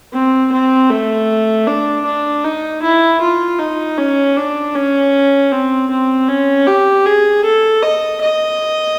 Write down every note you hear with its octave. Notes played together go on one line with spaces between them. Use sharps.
C4
C4
A3
D4
D4
D#4
E4
F4
D#4
C#4
D4
C#4
C4
C4
C#4
G4
G#4
A4
D#5
D#5